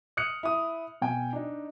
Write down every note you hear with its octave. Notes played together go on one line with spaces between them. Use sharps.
D#6 F6 F#6 C#7
E4 D#6
B2 G5 G#5
D4 D#4